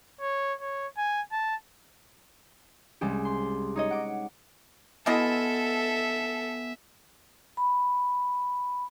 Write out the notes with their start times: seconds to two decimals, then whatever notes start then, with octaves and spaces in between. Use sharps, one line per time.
0.21 C#5
0.61 C#5
0.97 G#5
1.32 A5
3.01 C2 G3 G#3 C#4 G4
3.25 C6
3.76 D#4 C#5 D#5
3.90 F#5 D6
5.06 B2 B3 E4 A4 D#5 E5 G#5
7.57 B5